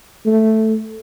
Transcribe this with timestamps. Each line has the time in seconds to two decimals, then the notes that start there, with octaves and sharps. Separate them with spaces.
0.26 A3